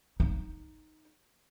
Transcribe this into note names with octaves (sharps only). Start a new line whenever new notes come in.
D#4